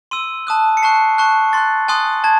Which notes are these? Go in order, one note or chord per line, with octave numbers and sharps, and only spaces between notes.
C6 E6 D#7
A5 D#6 F#6
C#7
A5 C#6 F#6 C7
A5 C#6 F#6
C6 F#6 A6
G#5 C6 D#6 F#6
A5 G#6